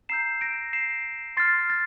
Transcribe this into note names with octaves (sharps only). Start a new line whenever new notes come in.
A#5 E6 G6 C7 E7
A#6 D7
C7 E7
C6 F6 A6 C7
A6